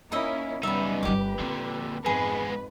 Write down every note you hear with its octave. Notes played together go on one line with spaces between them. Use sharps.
A#3 C#4 D#4 E4 D#5 E5
F#2 C#3 G3 B3 D#4 E5 B5
G1 G3 G4 B4 D6
A#2 D3 C4
F2 G#2 G#3 B3 G#4 B4